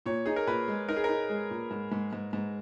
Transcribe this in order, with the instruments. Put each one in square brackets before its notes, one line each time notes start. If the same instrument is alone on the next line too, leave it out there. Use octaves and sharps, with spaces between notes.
[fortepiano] A#2 [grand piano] C#5
[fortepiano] D#4 [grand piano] G#4
[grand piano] A#4
[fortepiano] A#2 [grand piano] B4
[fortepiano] G#3
[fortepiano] D#4 [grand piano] A#4
[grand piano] G#4
[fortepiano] D#4 [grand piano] A#4
[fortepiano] G#3
A#2
G#2
G#2
G#2
G#2